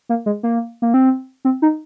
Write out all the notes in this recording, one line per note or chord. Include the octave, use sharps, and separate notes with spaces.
A#3
G#3
A#3
A#3
C4
C4
D#4